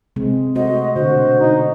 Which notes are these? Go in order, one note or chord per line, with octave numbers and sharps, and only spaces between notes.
C3 G#3 C4
A3 F#4 C5 D#5
B2 D3 F#4 C5
D#4